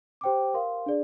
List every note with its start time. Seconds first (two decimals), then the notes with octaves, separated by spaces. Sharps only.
0.21 G4 C5 G5 D6
0.54 A#4 F5 C6
0.86 D4 G#4 D5